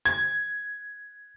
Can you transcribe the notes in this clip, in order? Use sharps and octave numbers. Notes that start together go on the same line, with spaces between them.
G#6